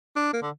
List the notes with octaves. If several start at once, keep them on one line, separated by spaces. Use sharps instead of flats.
D4
A#3
D3